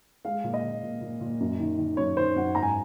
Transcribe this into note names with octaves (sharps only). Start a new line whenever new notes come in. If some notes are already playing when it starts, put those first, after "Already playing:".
G#3 F5
A#2
D#5
A#2
A#2
A#2
A#2
F#2
D#3
D#3
F#2 C#5
D#3 C5
F#2 F#5
G#2 A#5
G#5